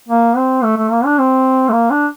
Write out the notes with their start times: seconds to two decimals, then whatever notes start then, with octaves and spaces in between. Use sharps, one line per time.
0.08 A#3
0.36 C4
0.63 A3
0.77 A3
0.91 A#3
1.05 D4
1.19 C4
1.68 A3
1.72 A#3
1.90 D4